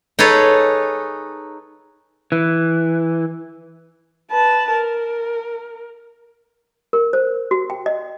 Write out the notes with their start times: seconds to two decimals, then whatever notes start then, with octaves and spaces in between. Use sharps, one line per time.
0.19 D#4 G#4 A4 B4 C#5
2.32 E3
4.31 B4 A5
4.74 A#4
6.93 A#4
7.13 C5
7.51 F#4
7.70 G5
7.86 D#5